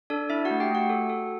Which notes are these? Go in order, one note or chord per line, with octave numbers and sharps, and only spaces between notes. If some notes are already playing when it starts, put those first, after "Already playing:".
D4 A4 D5
D4 E4 E5
F#4 F#5
A3
G4 G5
A3 F#4 F#5
A4
A4